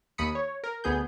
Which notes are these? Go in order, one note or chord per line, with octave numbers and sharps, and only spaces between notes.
D#2 B5 D#6 C#7
C#5
A#4
D2 B3 G#4 G6